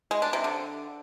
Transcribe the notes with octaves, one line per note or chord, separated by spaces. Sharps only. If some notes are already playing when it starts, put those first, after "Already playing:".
G#3
D4
C3
D3